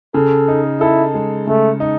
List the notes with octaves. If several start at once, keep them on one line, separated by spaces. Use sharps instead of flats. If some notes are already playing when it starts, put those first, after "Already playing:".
C#3 A4
D#4
E4 A4
G#3
C#3 A3
D#4